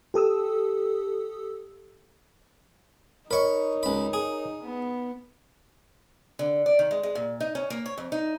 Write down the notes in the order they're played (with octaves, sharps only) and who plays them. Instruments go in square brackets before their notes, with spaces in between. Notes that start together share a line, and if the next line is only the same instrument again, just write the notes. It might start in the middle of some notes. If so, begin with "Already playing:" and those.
[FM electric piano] G4 A4 D#6 E6
[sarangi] D#4 [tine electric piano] A#4 C#5 D#5 [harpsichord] B5 C#6
[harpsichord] C#2 B5
G#4
[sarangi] B3
[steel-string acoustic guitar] D3
D5
D#3
G#3
G#3
A#2
D#4
C#4
A#3
C#5
F2
D#4